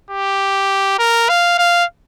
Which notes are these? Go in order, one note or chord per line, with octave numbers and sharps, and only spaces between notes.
G4
A#4
F5
F5